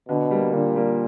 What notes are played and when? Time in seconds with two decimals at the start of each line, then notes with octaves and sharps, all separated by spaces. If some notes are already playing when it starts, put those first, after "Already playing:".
0.09 B2 D3
0.31 G3 A#3
0.53 A#2 D3
0.76 G3 A#3